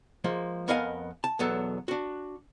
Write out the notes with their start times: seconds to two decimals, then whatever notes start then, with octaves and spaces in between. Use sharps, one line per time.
0.24 F3 G#3 A#3
0.68 F2 B3 A#4 D#5 F5 G#5
1.24 A5
1.39 B1 E2 F#3 B3 A4
1.88 D4 F#4